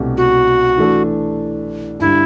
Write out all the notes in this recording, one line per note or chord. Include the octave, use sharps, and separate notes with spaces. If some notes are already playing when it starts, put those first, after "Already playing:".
Already playing: C2 B2 A3 D4 G4
F#4
E3 A3 D4 A4
G2 D3 G3 E4